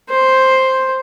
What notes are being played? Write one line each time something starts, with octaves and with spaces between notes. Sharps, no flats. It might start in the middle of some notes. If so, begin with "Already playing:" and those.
C5